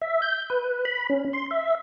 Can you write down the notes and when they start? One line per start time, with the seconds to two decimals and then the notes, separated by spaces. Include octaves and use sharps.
0.02 E5
0.22 G6
0.50 B4
0.85 B5
1.10 C#4
1.33 C6
1.51 E5